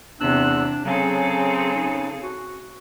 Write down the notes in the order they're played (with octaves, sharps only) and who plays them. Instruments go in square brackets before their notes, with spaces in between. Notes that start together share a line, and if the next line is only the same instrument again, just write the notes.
[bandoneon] E2 E6 F#6 [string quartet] C3 [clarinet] D4
[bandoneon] C#3 [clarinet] F#3 [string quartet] C4 G#4 A4
[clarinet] D#4
F#4